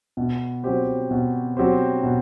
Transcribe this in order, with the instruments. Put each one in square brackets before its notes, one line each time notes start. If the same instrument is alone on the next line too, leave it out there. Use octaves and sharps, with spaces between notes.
[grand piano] B2
F#3 C4 G4 C5
B2
F#3 C4 G4 C5
B2